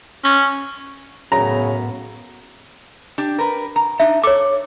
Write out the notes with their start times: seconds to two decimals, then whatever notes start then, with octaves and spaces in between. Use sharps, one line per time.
0.24 C#4
1.32 F#2 A2 C#3 B3 A#5
3.18 D4 G4
3.39 A#4 B4
3.76 A#5
4.00 D4 D#4 E5
4.24 A4 C#5 D6